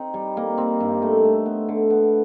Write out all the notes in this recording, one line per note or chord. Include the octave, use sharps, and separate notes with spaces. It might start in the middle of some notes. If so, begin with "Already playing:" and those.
Already playing: C4 D#4
G3
A#3
C4
G2
A3
A3
B3
D3
B3